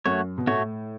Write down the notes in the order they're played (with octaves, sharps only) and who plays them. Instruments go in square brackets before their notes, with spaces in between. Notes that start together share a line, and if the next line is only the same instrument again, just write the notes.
[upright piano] F#2 [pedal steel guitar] A3 F#4 C#5
[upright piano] B2
[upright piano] A2 [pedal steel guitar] A3 F#4 C#5